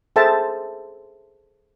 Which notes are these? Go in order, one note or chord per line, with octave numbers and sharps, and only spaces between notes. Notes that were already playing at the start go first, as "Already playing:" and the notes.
G#4 A4 C5 E5 G5 A5